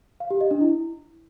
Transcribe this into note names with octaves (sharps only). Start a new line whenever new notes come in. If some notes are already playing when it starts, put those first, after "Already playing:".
F5
G4
D#5
D4
E4